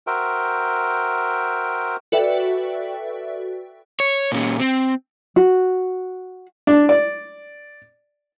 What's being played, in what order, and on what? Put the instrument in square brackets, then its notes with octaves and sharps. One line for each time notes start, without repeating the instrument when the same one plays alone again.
[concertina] F#4 A#4 C5 E5 G5
[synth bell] F#4 A4 B4 D5 E5 G5
[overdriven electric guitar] C#5
A#2 C#4
C4
[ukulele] F#4
[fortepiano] D4
D5